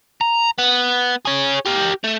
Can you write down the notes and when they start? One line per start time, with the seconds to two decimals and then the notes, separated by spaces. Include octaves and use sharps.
0.21 A#5
0.59 B3
1.25 G#4 C#5
1.66 G4 A#4
2.04 A3